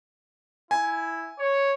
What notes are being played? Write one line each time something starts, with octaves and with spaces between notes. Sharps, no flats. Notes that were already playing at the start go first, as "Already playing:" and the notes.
E4 G#5
C#5